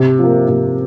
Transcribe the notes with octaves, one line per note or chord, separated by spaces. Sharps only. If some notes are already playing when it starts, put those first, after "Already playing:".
Already playing: C3
F3 A#3
C3